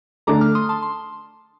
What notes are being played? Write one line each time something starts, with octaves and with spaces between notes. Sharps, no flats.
D3 A3 D4 A4 A#5 D6
D6 F6
C6 D#6
A5 C6
C6